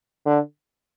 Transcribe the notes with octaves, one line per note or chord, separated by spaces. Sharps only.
D3